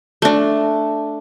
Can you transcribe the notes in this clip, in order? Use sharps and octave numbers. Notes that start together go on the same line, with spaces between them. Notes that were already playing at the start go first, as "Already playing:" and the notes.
A3 D4